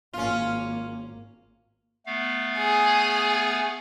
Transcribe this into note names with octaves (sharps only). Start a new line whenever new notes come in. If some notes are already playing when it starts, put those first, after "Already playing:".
G#1 A#3 C#4 F4
A3 B3 F5
G#4